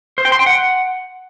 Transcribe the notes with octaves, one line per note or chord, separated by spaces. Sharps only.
C5
G5
C6
G5
F#5